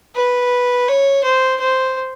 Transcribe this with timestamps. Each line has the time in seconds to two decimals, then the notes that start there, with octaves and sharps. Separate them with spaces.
0.16 B4
0.88 C#5
1.24 C5
1.60 C5